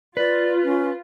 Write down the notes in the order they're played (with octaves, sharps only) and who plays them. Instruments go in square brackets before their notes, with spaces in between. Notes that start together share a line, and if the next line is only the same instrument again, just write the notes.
[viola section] F4 [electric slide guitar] B4 [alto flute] D5
[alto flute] C#4